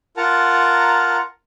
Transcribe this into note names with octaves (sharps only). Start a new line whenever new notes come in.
F4 A#4 F#5 A5 A#5